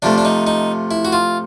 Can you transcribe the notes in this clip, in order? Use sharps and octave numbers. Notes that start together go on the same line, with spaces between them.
C3 F3 A3 D4
D4
D#4
D#4
E4
F#4
F4